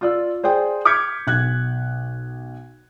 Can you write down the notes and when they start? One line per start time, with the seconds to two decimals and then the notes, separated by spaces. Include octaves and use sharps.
0.01 F4 D5 E6
0.43 G#4 C5 D5 G5
0.85 D6 F6 G6 G#6 B6 C#7
1.27 B1 F#6 G#6